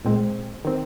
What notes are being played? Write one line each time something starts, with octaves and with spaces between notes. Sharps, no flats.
A#2 G#3 C4
D#3 C4